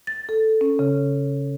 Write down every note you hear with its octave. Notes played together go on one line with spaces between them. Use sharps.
A6
A4
C#4
C#3